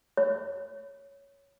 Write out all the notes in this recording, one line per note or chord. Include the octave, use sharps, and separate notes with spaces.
C#5